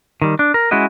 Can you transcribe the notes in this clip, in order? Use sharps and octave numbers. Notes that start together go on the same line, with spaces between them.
D#3 G3
D4
A#4
G#3 C#4 E4 F#4 D#5